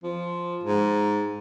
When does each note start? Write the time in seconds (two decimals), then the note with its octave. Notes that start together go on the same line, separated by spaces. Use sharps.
0.04 F3
0.63 G#2